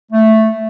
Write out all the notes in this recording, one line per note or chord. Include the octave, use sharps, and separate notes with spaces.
A3